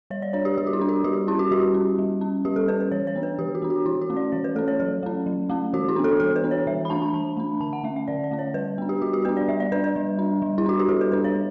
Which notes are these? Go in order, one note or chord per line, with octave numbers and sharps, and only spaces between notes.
G3 C#5
D5
D4 C#5
G4
G3 G4
F#4
E4
D4
F#4
G3 G4
C#4 E4
F#4
G3 G4
C#4
G3
C#4
G3 G4
A4
C#4 B4
B4
E3 C#5
C#5
B3 D4
B4
E3 G4
F#4
B3 D4
F#4
E3 E4
F#4
A3 C#4
D5
E3 C#5
B4
A3 C#4 A4
C#5
F#3 A4
A3 C#4
F#3
A3 C#4
E3 F#4
E4
B3 D4
A4
E3 A4
B4
B3 D4
C#5
E3 E5
B5
A3 D4 A5
A5
E3 A5
A3 D4
D3 A5
F#5
A3 C#4 E5
E5
D3 D5
D5
A3 C#4
C#5
G3 B4
B3 D4
G4
G3 F#4
G4
B3 D4 B4
D5
G3 E5
D5
D4 B4
B4
G3
D4
G3
E4
D4 F#4
G4
G3 A4
B4
D4 B4
C#5
G3